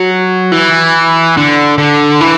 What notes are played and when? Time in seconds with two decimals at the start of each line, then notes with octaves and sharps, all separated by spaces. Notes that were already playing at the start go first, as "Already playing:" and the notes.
Already playing: F#3
0.52 E3
1.37 D3
1.78 D3
2.21 E3